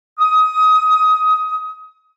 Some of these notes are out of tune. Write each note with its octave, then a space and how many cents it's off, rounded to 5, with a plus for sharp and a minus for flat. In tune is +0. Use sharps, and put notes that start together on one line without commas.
D#6 +20